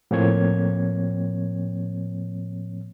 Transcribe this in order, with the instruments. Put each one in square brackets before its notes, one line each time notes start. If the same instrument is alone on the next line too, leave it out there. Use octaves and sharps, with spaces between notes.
[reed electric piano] A2 F3 A#3 C4 C#5 G#6